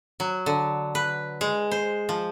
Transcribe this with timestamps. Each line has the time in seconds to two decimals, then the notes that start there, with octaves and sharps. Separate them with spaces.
0.20 F#3
0.46 D3
0.95 B4
1.41 G#3
1.71 C5
2.09 F3